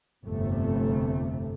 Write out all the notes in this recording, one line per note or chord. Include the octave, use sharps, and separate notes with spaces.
G1 F2 C3 A3